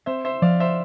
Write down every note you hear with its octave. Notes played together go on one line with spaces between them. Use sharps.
C4 C5 E5
C5 E5
F3 D5 F5
C5 E5